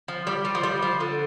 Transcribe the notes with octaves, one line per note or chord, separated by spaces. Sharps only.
F3
G3
G3
F3
G3
F3
D3